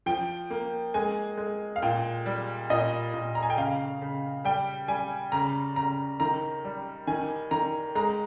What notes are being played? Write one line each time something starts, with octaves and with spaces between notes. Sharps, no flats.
F3 G5
A#3
G#3 G#5
G#3
F5
A#2 G5
G3
A#2 D#5
A#2
A#5
G#5
G5
C#3 F5
C#3
G3 G5
G3 G#5
C#3 A#5
C#3 A#5
D#3 A#5
G3
D#3 G#5
D#3 A#5
G#3 A#5